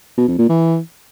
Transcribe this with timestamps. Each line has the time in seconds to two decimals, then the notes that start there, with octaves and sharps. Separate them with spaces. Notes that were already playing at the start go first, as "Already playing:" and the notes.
0.17 B2
0.28 F2
0.38 A#2
0.49 E3